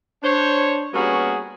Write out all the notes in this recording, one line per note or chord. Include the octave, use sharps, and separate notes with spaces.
D4 C5 C#5
G3 A#3 B3 C#4 F#4 G#4